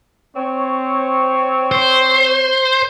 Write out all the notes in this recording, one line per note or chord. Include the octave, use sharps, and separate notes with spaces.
C4 C#5
C5